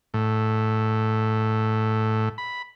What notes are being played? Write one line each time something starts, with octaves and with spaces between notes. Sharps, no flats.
A2
B5